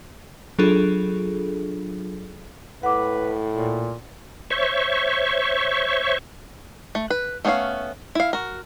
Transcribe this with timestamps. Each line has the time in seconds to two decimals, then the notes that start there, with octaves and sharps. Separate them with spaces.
0.59 F#3 D4 F4 G#4 A4
2.83 A2 B4 F#5 D6
3.51 A#2
4.50 C5 C#5 E5 C#6
6.95 A3
7.10 B4
7.45 A3 B3 C#4 A4 F5
8.15 E4 F5
8.33 F#4 A#4